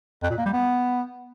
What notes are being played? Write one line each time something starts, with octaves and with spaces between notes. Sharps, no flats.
F2
A#2
A#3
G3
B3